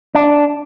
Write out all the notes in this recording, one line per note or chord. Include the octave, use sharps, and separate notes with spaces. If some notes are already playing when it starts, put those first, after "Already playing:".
D4